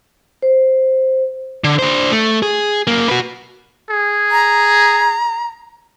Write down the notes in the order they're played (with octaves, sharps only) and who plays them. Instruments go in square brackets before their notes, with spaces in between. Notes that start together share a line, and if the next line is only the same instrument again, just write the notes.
[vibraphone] C5
[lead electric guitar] D3
D4 C5
A3
G#4
F#2 A#3
F#4 B4
[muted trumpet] G#4
[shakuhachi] A#5